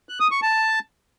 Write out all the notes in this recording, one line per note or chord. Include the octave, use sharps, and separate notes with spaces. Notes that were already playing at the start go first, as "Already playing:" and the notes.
F#6
D#6
C#6
A5